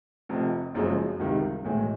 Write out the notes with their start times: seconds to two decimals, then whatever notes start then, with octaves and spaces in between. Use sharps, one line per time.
0.29 F1 F2 C3
0.74 F#1 F#2 C#3 F3 G#3
1.19 C#2 C3 D#3 G3
1.64 B1 A2 E3 G#3